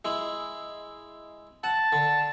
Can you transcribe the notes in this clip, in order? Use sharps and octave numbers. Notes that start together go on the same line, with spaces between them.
G#3 E4
F#5 A5
D3